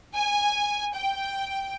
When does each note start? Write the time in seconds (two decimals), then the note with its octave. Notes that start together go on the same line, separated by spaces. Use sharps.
0.15 G#5
0.95 G5